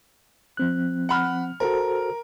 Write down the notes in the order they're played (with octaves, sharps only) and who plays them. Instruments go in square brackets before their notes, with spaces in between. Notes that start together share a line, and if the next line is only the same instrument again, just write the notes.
[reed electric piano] F3 C4 F#6
[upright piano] F#5 B5 F6
[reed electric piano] F#4 A4 C5 [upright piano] A#4